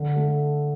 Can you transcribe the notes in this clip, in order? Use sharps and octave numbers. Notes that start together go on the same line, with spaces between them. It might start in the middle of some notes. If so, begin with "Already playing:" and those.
Already playing: D3
A3